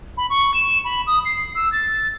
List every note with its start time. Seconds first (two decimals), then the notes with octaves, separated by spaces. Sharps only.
0.17 B5
0.30 C#6
0.54 E7
0.85 B5
1.07 D#6
1.25 C7
1.55 E6
1.72 A6